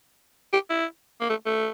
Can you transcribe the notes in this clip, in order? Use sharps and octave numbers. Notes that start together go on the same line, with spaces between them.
G4
E4
A#3
A3
A3